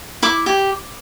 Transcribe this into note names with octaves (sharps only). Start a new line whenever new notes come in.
E4 D6
G4